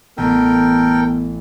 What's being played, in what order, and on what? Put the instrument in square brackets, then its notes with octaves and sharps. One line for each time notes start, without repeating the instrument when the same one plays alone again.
[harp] A1 [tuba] B3 [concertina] A4 A#4 G5